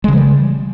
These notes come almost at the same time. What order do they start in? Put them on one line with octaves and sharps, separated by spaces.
G#3 C#3 E3 G3